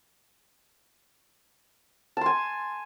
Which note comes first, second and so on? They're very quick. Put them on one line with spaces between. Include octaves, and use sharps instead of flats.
A5 C6 G#5